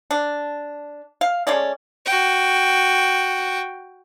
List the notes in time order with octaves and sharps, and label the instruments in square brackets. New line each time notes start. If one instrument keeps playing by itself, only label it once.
[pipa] D4
F5
G#3 A3 C#4 D5
[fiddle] F#4 G5